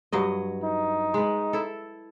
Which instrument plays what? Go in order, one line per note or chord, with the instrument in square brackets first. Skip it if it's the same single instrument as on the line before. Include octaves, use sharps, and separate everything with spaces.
[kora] G2 F#3 D#5
[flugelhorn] D#4
[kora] G#3 B4
E4 A4